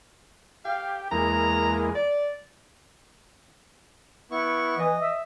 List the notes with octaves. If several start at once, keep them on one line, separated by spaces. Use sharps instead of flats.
G4 F5
E2 G#3 A#3 A#5
D5
B3 E4 C#6
E3 D#5
E5